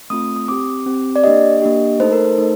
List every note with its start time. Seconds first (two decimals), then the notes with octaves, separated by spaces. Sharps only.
0.10 A3 C4 F4 D#6
0.36 D#6
0.48 C4 G4 D6
0.86 C4 G4
1.16 D5
1.24 A#3 D4 G4 D#5
1.62 A#3 D4 G4
2.00 A3 D#4 A4 C5
2.12 A#4
2.25 C5
2.38 A3 D#4 A4